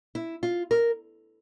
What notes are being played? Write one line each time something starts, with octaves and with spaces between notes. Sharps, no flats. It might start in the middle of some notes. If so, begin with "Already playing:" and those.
E4
F4
A#4